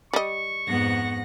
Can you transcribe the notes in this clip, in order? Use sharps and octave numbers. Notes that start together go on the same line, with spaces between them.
G3 D#5 C#6
F2 G#2 B3 F#5 A#6